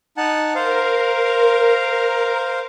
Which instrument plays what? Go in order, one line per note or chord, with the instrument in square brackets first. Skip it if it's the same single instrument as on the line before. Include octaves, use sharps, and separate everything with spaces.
[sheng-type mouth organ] D#4 F#5 A5
[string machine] A#4 [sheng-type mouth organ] C5 F5